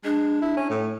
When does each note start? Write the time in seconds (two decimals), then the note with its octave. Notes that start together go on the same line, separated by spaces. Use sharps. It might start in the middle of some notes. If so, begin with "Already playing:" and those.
0.04 G#3 D4
0.42 E4
0.57 C#4
0.70 A2